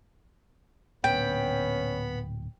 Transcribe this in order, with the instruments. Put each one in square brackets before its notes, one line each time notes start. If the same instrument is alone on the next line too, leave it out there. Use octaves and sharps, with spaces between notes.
[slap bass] D1 A#2 D3 [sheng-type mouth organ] B3 B5 [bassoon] C#4 [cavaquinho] G5